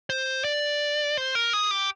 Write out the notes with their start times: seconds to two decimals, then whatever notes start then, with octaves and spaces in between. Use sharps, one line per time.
0.10 C5
0.44 D5
1.17 C5
1.35 A#4
1.53 G#4
1.71 G4